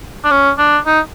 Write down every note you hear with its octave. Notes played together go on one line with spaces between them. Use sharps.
D4
C#4
D4
D#4